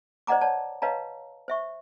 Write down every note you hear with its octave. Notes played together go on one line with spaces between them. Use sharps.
C5 D5 D#5 F#5 A#5 D6
C#5 D5 F#5 A5
B4 C#5 D#5 F5 A5 A#5
C5 E5 C#6